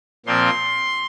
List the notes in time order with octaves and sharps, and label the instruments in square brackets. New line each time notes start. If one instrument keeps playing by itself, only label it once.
[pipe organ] A#2 F3 C4 C6